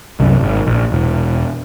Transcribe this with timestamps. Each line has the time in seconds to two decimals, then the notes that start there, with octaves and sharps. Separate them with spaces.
0.20 C2 F#2
0.43 G#1
0.67 A#1
0.92 E1